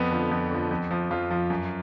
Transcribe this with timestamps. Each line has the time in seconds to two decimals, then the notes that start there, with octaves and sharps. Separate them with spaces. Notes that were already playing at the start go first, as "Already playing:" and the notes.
Already playing: F2 B3
0.11 D3 F3
0.31 F2
0.51 D3 F3
0.71 F2
0.91 F3
1.11 F2 F4
1.31 F3
1.50 F#2